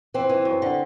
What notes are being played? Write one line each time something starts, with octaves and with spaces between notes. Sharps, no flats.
E3 C4
E3
F#2
D3